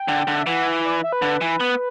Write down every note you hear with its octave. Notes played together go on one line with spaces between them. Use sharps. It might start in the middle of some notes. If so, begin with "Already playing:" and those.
Already playing: G5
D3
D3
E5
E3 F#5
D5
E5
B4
D3
E3
B3